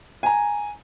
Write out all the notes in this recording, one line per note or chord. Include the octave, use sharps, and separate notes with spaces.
G#5 A#5